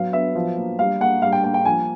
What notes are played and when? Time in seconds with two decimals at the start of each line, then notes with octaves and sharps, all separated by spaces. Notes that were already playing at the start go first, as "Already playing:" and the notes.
Already playing: F#3 B3 F5
0.13 B3 E5
0.35 F3
0.57 A#3
0.78 G3 F5
1.00 A#3 F#5
1.22 G3 F5
1.32 G5
1.43 A#3 G5
1.54 G5
1.65 F3 G#5